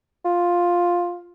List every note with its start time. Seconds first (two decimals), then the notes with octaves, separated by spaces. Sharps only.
0.25 F4